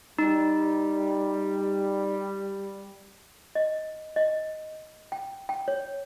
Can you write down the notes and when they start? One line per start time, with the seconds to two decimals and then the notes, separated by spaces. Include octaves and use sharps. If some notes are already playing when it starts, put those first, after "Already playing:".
0.19 G3 D#4
3.55 D#5
4.16 D#5
5.12 G5
5.49 G5
5.68 C#5